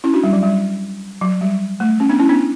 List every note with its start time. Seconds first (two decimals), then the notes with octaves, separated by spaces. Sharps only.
0.04 C#4 E4
0.14 D4 F#4
0.24 G3
0.33 F#3
0.43 G3
1.21 F#3
1.41 G3
1.80 A3
2.00 C#4
2.09 B3 D4
2.20 C#4 E4
2.29 B3 D4